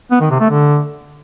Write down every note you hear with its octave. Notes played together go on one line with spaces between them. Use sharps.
B3
D#3
C3
A3
D3